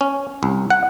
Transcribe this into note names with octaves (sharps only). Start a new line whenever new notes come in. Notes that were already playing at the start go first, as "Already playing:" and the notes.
C#4
C2
F#5